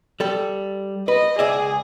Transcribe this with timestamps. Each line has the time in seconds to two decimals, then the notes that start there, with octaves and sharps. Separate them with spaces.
0.20 G3 A4
1.08 B4 D#5
1.39 C#2 G#4 D5 E5